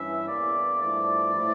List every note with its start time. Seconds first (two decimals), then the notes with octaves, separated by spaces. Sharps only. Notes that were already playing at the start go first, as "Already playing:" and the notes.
Already playing: G2 E3 C#4 E4 E5
0.28 E2 E3 A#3 D5
0.81 G2 F3 A3 E4 D5
1.35 A2 F3 A3 E4